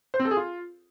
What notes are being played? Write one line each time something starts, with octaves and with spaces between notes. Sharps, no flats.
C5
C4
A4
G#4
F4